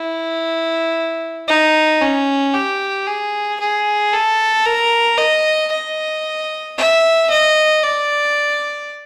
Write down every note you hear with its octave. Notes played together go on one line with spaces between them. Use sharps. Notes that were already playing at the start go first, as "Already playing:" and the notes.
Already playing: E4
D#4
C#4
G4
G#4
G#4
A4
A#4
D#5
D#5
E5
D#5
D5